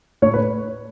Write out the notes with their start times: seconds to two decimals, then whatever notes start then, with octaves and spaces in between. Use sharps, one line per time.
0.22 A2 C#5
0.34 B4